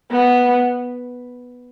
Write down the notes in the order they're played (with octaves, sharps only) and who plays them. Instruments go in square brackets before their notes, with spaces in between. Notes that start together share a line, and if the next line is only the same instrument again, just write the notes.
[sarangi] B3